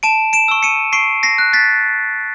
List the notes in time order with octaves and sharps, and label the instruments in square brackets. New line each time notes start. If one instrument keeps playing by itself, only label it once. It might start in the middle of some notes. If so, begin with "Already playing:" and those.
[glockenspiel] A5 D7 E7
D7 E7
C#6 E6
C#7 D#7
C#6 C7 D7
A#6 C7
F#6
A6 B6